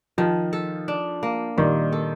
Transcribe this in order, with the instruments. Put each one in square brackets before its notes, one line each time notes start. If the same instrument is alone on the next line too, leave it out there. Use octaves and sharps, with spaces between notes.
[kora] D#3 [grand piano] F3
[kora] A4
D4
A#3
[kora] A#2 [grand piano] D#3 G3
[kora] A4